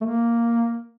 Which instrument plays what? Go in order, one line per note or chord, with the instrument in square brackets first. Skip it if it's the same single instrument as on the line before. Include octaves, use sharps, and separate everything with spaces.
[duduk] A3
A#3